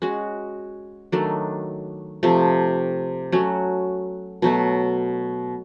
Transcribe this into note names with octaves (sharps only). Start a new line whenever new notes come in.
G#3 C#4 F#4
D#3 F#3 A3 D4
C3 F3 A3
F#3 A3 C#4 F#4
B2 F#3 A3